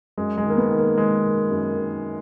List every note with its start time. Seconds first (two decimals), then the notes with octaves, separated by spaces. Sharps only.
0.18 F#2 G#3
0.38 G#3
0.45 D#3 A#3
0.57 B3
0.71 D#3
0.78 A#3
0.97 D#3 G#3
1.24 D#3
1.51 F#2
1.77 D#3